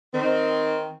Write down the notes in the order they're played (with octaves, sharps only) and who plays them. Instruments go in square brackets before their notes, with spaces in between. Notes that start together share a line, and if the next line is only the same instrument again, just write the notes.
[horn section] D#3 C4